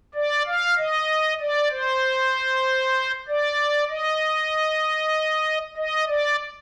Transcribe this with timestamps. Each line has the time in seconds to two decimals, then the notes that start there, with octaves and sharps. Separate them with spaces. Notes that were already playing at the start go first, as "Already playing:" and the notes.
0.14 D5
0.46 F5
0.77 D#5
1.40 D5
1.71 C5
3.28 D5
3.90 D#5
5.77 D#5
6.08 D5